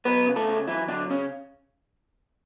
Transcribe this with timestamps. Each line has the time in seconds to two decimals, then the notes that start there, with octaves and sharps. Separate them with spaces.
0.05 F#3 B3 B4
0.26 C#3
0.36 A3 A4
0.47 C#3
0.68 E3 F#3 E4
0.88 D3 F#3 D4
1.10 C#3 C#4